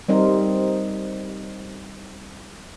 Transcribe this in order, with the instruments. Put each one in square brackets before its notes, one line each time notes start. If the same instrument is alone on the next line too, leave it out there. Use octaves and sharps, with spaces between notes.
[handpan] G3 C4 D#4 A#4 C5